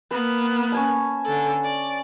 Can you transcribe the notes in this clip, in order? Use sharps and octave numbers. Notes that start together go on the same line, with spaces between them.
A#3 B3 B4
C#4 G#5 A5
D3 A4
D5